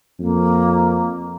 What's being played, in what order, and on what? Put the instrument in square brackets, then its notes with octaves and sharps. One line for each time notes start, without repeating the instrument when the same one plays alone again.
[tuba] F2 [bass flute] A#3